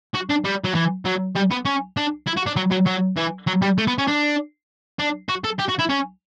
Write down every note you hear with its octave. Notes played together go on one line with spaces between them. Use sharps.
F#4
D4
G3
F#3
E3
F#3
G3
B3
C#4
D4
E4
F#4
D4
F#3
F#3
F#3
E3
F#3
G3
A3
B3
C#4
D4
D4
F#4
A4
G4
F#4
E4
C#4